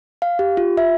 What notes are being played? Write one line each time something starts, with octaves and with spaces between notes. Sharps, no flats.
F5
G4
F4
E5